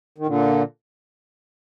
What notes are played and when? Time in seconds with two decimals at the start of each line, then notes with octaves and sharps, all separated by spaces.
0.18 D#3
0.27 A#2 D3